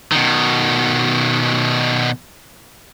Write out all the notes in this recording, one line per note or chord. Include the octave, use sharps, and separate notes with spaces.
B2 D#3